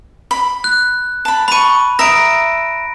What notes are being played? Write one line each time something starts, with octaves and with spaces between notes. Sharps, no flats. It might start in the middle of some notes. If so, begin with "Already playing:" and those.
B5
F#6
A5 B5
A5 B5 C#6 D#7
E5 A#5 D#6 A#6 D7